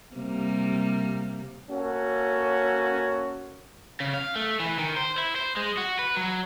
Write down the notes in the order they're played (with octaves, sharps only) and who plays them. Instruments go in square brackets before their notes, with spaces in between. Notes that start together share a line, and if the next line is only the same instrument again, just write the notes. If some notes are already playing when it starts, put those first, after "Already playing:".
[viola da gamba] C3 G3 A#3
[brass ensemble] A#3 C#4 F#4 A4
[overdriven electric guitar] C#3
F5
A3
E3
D#3
C5
E4
C5
G#3
F#4
B4
F#3